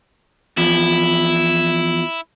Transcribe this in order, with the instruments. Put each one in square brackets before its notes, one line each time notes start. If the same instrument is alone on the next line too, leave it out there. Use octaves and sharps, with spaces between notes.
[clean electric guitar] E2 F3 [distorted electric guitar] E4